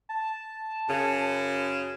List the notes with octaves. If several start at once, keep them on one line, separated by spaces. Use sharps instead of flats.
A5
F#2 C#3